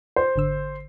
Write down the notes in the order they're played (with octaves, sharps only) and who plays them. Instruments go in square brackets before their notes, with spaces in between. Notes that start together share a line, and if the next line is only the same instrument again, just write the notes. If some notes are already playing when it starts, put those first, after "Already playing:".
[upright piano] C5
[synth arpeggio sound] G#1 D3 E6